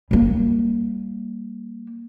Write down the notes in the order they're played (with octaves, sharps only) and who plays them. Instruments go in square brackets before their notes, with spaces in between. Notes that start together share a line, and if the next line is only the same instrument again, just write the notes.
[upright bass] G3 A#3